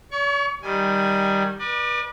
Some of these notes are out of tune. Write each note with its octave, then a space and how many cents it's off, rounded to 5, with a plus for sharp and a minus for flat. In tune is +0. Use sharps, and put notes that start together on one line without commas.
C#5 +45 C#6 +20
D#3 +0 G3 +0 G#5 +0
B4 -35 D5 +30